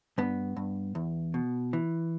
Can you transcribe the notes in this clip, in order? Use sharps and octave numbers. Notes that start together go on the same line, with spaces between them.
G2 B3
G2
E2
B2
E3